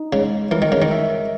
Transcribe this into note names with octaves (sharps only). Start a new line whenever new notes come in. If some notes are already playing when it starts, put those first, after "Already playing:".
Already playing: D#4
C#3 G#3
E3 A#4
D#3
C#3
D#3
E5